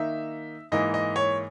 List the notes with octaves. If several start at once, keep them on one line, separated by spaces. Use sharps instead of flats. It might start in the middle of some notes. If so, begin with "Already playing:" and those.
Already playing: D#3 A#3 D#4 E5
G#2 E3 A#3 D#5
D#5
C#5